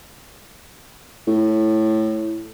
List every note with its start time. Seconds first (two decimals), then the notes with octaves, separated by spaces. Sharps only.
1.27 A2